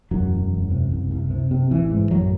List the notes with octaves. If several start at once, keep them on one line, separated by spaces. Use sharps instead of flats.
E1 F#2 F#3
E1
E1
C3
C2
C2
C3
C3
A1 E3
G#2
A1 F#2 F#3